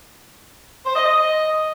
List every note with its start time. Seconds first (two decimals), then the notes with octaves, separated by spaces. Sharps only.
0.86 C5
0.96 D#5
1.06 D#5